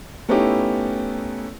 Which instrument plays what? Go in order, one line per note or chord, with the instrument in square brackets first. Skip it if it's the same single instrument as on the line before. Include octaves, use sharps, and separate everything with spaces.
[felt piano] A3 B3 C#4 D#4 E4 G4